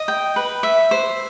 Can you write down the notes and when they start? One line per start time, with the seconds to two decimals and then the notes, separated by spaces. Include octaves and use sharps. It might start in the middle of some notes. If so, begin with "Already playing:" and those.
Already playing: D#5
0.08 G5
0.36 B4
0.63 E5
0.91 C5